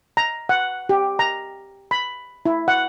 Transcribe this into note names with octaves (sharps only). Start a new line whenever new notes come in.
A#5
F#5
G4
A#5
B5
E4
F#5